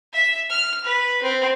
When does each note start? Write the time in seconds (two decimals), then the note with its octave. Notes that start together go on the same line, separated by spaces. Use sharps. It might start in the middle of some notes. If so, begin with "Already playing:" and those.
0.13 E5
0.49 F6
0.84 B4
1.22 C4